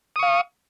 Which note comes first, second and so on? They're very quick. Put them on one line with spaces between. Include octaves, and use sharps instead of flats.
D#6 C#6 F5